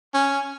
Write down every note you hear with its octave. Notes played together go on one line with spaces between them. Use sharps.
C#4